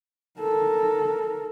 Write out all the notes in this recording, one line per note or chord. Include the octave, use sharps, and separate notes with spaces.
A4 A#4